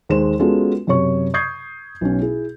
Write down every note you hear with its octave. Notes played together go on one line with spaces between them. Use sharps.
D#2 G#3 C5 E7
G#3 B3 C#4 F4 F#4 A4
F#2 C3 G4 C#5 C#6
C#6 D#6 G6 G#6 C7
B1 C#4
E4 G#4